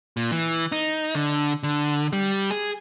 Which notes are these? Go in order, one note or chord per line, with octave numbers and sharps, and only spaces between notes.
A#2
E3
D#4
D3
D3
G3
G#4